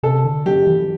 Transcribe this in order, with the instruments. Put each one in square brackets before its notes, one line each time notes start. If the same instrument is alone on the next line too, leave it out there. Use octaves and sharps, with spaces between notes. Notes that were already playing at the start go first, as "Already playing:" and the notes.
[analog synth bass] C3 [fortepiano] A4
[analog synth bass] D3
[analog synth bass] F#3 [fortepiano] G4
[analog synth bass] E3